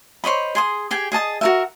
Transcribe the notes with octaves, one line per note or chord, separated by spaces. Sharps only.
C5 C#5 D#5 B5
G#4 C6 D#6
G4 G#4 G5 G#5
G#4 D#5 A5 D#6
F#4 A#4 E5